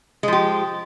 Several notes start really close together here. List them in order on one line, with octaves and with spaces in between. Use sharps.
G#3 F3 G4